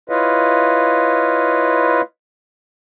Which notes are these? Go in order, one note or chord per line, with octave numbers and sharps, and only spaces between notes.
E4 F4 B4 C#5 D#5 F5